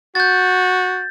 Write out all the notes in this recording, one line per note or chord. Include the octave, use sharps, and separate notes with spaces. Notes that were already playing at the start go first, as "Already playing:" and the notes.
F#4 G6 A6